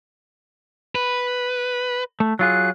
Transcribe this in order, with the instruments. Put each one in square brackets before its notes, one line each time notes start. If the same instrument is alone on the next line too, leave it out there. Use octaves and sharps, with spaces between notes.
[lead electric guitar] B4
[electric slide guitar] A3
[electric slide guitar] F#3 F4 G#4 [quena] F#6